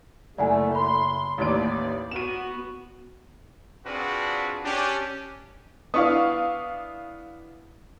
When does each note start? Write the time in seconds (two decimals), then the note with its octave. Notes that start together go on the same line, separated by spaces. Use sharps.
0.38 F#1 A3 E4 D5 F#5 G#5
0.75 B5 C6
1.38 A1 D#2 D5 D7
2.11 B3 F#4 D#7 E7
3.85 C4 D4 F4 F#4 G#4 B4
4.64 C#4 D4 G4
5.94 B3 D4 E4 F5 C#6 D#6